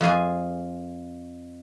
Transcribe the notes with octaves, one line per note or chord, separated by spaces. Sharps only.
F2 F4 G#4 G#5